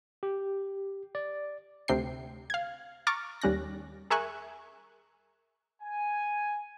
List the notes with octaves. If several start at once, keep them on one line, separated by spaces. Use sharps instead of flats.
G4
D5
D2 C3 G5 C7
F5 G#6
A#5 C#6 D6 F6 A6
D#2 G3 C#4 F#6 A#6
G#4 A#4 E5 G#5 C#6 F#6
G#5